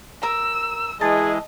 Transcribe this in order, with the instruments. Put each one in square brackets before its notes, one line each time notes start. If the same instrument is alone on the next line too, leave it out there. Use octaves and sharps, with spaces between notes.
[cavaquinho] A#4 A#5 [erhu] E6
[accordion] E3 G#3 [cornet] G#4 [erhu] D#5 [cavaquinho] A5